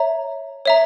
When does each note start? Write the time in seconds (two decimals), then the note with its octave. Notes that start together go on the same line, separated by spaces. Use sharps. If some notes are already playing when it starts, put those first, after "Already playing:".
Already playing: C#5 E5 A#5
0.66 C#5 E5 A#5